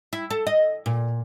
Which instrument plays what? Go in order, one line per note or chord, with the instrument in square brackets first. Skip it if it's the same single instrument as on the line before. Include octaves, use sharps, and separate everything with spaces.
[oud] E4
A4
D#5
A#2